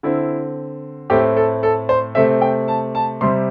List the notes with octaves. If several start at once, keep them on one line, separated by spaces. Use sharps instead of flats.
D3 C4 E4
A2 A3 C4 G4
A4
A4
C5
C3 A3 C4 E5
G5
A5
A5
C3 G3 C4 C6